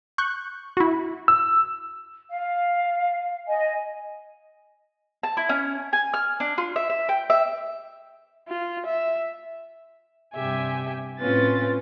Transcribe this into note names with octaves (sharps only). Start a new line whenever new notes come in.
C#6 F#6 G6
E4 F#4
E6
F5
D#5 G#5
A5
E4
C#4
G#5
F6
D4
F4
E5
E5
G5
E5
F4
E5
G2 C3 G4 E5 G#5
A2 C4 C#4 F4 B4 A6